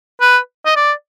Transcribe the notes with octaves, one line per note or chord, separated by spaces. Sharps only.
B4
D#5
D5